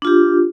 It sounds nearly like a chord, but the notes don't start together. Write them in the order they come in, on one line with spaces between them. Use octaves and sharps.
D4 F4 G4